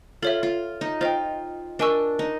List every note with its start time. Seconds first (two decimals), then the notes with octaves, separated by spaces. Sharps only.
0.22 F4 A4 C#5 E5
0.43 F4
0.81 D#4
1.01 F4 C5 D#5 G5
1.79 D4 A#4 D#5 G#5 C#6 E6
2.19 D#4